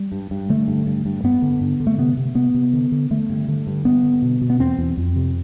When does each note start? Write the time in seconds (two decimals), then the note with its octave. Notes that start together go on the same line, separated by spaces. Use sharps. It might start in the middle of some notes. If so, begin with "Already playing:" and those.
Already playing: G3
0.12 G2
0.31 G2
0.49 D3 A3
0.68 G2
0.86 G2
1.06 G2
1.24 G2 B3
1.42 D3
1.61 G2
1.80 D3
1.87 A3
1.98 C3 B3
2.17 C3
2.35 C3 B3
2.54 C3
2.73 D3
2.92 D3
3.11 D3 A3
3.29 G2
3.48 D3
3.67 G2
3.85 G2 B3
4.03 D3
4.22 B2
4.41 B2
4.50 B3
4.59 E2 C4
4.78 E2
4.97 F2
5.16 C3